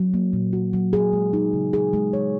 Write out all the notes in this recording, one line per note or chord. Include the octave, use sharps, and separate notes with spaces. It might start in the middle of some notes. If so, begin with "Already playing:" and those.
Already playing: F#3
A#3
A#2
F#4
F#3
G#4
G#3
D#4
C#3
G#4
G#3
C#5